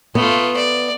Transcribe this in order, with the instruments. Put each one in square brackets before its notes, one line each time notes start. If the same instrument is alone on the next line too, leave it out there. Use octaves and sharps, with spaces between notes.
[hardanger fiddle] A3 F4 [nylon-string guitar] B3
[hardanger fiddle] D5